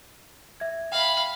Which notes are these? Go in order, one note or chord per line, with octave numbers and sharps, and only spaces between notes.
E5 G#6
E5 F5 G5 B5